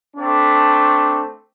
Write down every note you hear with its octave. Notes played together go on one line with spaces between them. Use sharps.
A3 C4 D4